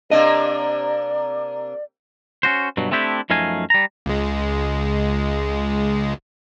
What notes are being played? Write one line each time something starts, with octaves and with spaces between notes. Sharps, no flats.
C3 A#3 D4 D5 D#5
C#4 F#4 C5
G2 B2 F#3
A3 C4 D4 E4 G4
F#2 F3 A3 D#4 F5 G#5
G3 A#5
C#2 G#3